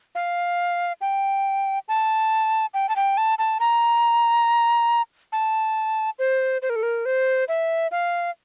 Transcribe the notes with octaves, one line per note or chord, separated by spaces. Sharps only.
F5
G5
A5
G5
A5
G5
A5
A5
A#5
A5
C5
C5
A#4
A4
A#4
C5
E5
F5